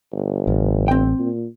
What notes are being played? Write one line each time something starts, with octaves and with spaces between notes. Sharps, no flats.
G1
A1
C4 G5
A#2